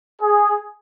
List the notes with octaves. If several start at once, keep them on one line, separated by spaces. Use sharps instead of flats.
G#4